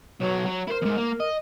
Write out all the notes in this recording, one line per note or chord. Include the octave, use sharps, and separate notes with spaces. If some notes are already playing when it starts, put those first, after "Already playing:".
B1 F#3 C#5
F#3
E4 A#4 C5
E2 G#2
A#3
D#5